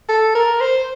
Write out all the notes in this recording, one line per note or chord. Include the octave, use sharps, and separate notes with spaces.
A4
A#4
C5